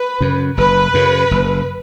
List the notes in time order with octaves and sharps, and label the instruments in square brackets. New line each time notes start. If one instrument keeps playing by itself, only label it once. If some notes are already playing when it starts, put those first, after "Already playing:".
Already playing: [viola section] B4
[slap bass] F#2 C#3
[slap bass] F#1 [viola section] B4
[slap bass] F#2 C#3
F#1